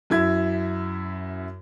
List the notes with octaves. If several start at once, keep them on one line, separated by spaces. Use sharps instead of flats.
F#2 E4 G#6